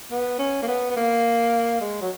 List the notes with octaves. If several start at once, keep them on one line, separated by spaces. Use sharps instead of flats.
B3
C#4
A#3
B3
B3
A#3
G#3
F#3